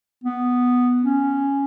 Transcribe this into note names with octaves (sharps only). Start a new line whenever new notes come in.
B3
C#4